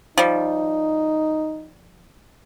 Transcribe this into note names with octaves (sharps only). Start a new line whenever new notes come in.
F3 G3 D#4